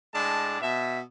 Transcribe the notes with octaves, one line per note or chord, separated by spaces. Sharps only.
A2 G#3 D4 A5
B2 E5